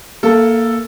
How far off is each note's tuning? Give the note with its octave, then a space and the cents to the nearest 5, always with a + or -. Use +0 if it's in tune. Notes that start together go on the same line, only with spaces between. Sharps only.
A#3 +0 A4 +0 E5 +35